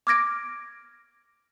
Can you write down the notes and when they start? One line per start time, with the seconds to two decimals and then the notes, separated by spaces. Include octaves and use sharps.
0.07 D6 F6 G#6 A#6 D7